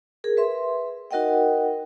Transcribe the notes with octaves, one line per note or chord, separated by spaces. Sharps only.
G#4 A#4
B4 E5 C6
D#4 F#4 A#4 D#5 F#5 G5